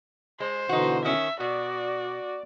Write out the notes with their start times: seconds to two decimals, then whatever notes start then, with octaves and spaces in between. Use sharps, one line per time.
0.40 G#3 C5
0.69 B2 D3 E3 D#4 F#4
1.04 D#3 C#4 E5
1.40 B2 F#4 D5